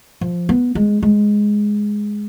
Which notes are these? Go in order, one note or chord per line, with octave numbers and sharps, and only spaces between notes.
F3
B3
G#3
G#3